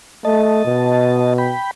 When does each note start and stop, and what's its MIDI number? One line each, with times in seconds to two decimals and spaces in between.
0.25 0.62 57
0.25 1.34 75
0.25 1.34 81
0.65 1.54 47
1.38 1.71 79
1.38 1.71 83